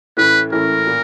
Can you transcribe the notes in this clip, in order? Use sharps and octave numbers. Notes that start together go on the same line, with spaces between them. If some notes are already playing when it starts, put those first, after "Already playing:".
A2 E3 A3 C#4 E4 B4
A2 E3 A3 C#4 E4 A#4
A#2